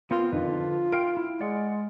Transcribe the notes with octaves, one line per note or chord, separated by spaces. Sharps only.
B3 C4 F4 A#4
F2 D3 D#3 F4 B4
F3
A#4 F5 G5 C6 F6 D7
E4
G#3 D5 F#5